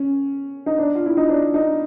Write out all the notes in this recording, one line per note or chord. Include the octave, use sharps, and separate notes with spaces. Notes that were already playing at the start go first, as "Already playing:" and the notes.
Already playing: C#4
D#4
D4
F4
E4
D#4
D4
D#4